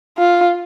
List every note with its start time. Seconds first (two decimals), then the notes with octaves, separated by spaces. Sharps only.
0.18 F4